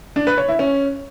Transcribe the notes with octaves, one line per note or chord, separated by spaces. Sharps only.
D4
B4
C#5
E4
C#4